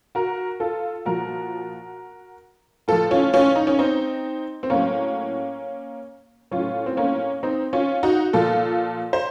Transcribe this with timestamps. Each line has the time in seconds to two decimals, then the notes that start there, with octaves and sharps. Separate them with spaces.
0.15 F#4 A#4
0.60 F4 A4
1.06 A#2 F3 F#4 A#4
2.88 A2 F3 F4 A4
3.11 C#4 F4
3.33 C#4 F4
3.56 D#4
3.67 C#4
3.79 C4 D#4
4.63 C4
4.70 A2 F#3 A#3 C#4
6.51 A2 F#3 C#4 F4
6.86 C4
6.97 A#3 C#4
7.43 C4 D#4
7.73 C#4 F4
8.03 D#4 F#4
8.33 A#2 F3 F4 A4
9.13 C5